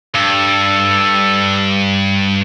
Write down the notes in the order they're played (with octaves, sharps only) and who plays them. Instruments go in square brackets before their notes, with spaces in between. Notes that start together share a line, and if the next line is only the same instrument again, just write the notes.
[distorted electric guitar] G2 [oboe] A4